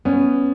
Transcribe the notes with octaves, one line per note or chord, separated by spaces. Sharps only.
B3 C#4